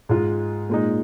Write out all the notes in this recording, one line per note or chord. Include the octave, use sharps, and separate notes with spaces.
G#2 G#3 F4
A#2 G#3 D#4